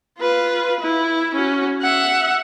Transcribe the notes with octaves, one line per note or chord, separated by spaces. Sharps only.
F4 B4
E4
C#4 F#4
E5 F#5